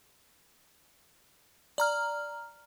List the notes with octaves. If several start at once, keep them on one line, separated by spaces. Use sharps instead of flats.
D5 A#5 F6